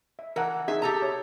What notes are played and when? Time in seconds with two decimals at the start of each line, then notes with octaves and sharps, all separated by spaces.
0.19 E5
0.36 E3 A#4 F#5 A5
0.68 D#4 G#4 E5
0.82 G4 A4 A#5
1.02 C#5